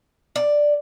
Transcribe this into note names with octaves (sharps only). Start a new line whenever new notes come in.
D5